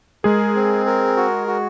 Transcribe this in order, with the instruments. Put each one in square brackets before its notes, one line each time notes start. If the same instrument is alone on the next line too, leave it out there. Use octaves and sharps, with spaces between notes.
[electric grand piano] G#3 G#4 [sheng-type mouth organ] A#4
[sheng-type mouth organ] C4
A#4
F#4
F#4